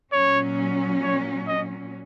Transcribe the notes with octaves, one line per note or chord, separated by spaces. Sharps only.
A#2 F#3 C#4 C#5
C#5
D#5